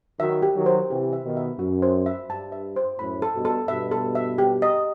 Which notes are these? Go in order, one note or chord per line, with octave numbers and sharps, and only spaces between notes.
D#3 F#3 E5
G4
D#3 F#3
C5
C3 E3 G4
E5
B2 D#3
E5
F#2 F#4
C5
E5
G2 A5
E5
C5
F#2 A2 B5
A4
G2 B2
A4
G2 B2 E5
A4
E5
G4
D#5